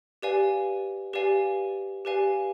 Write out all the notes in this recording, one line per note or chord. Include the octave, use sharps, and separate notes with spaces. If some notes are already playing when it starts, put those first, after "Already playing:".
G4 B4 D5 F5 G#5
G4 B4 D5 F5 G#5
G4 B4 D5 F5 G#5